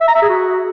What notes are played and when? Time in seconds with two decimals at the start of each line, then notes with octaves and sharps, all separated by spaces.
0.01 E5
0.08 A#5
0.15 E5
0.22 G#4
0.29 F#4